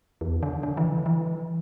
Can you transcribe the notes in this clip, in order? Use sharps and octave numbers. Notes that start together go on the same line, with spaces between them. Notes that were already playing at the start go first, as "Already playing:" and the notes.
E2
D3
D3
E3
E3